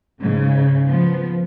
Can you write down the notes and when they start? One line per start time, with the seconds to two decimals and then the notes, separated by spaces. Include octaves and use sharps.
0.21 G#2 C#3
0.88 F3 B3